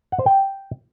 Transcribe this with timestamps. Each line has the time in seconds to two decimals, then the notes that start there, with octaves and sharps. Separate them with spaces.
0.12 F#5
0.19 C5
0.26 G5